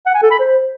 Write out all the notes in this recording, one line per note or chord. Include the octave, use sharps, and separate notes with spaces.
F#5
G#5
A4
B5
C5